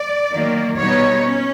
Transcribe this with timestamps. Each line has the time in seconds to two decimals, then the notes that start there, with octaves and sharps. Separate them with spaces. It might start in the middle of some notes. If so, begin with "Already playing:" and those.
Already playing: D5
0.32 D#3 F#3 A#3
0.77 B2 G3 B3 D#4 C#5
1.23 C#4